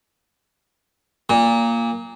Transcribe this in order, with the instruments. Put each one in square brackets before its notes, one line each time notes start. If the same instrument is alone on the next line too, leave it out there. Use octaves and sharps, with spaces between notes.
[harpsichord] A#2